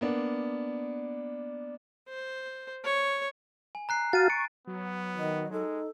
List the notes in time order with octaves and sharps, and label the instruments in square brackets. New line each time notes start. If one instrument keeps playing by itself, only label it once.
[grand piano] A#3 B3 D4
[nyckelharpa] C5
C#5
[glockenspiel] G#5
A#5 F#6 C7
[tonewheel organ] F#4 F5 A5 [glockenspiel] A6 D#7
[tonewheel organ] C#6 [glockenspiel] D7
[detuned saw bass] F#3 [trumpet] B3
[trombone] D#3 [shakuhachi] D#5
[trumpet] G#3 [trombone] D#4 [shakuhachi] A4